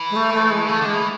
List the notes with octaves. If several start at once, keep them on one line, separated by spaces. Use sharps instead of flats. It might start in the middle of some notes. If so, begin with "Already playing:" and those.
Already playing: E3
G#3
A3
A3
G#3
C#3 A3
D3 G#3
E3